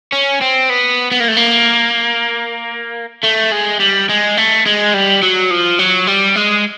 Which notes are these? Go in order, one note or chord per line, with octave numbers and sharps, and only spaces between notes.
C#4
C4
B3
B3
A#3
A3
A#3
A3
G#3
G3
G#3
A3
G#3
G3
F#3
F3
F#3
G3
G#3